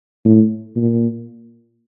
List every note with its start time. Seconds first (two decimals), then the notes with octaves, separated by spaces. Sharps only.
0.25 A2
0.76 A#2